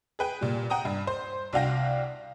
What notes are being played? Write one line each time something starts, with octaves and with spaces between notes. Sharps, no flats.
G#4 B4 G5
A#2 G3
F#5 G5 A#5 D#6
G2
C5
C2 D4 F#4 F5 G5 A#6